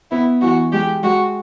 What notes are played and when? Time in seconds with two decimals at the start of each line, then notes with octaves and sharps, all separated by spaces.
0.11 B3 E4
0.41 E3 F#4
0.72 G#3 G4
1.03 G#3 F#4